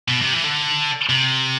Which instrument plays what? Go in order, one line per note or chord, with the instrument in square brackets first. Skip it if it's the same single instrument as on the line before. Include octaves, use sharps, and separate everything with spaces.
[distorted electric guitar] B2
C3
E3
D3
C3